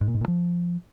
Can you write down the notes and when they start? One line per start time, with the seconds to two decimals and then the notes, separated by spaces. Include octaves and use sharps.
0.01 G#2
0.08 A#2
0.14 G#2
0.21 A#2
0.28 F3